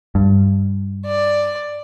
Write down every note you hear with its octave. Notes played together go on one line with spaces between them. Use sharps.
G2
D5